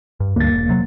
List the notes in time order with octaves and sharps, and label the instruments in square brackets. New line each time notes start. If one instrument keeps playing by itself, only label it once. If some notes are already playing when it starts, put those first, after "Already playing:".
[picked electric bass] G2
[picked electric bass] D2 G2 [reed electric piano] A#3 A6
[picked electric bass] E1
C3 F#3